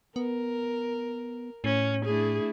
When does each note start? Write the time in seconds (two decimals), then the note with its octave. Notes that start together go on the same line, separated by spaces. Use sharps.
0.16 B3 A#4
1.64 A2 C#4
2.05 A3 D4 E4 G#4